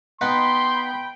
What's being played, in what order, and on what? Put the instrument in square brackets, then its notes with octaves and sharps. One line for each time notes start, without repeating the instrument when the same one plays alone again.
[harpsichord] B3 D#4 B4 [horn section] G5 B5 [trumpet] C6